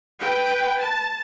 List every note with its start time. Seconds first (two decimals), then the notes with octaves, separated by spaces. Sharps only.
0.20 B4 G5
0.80 A5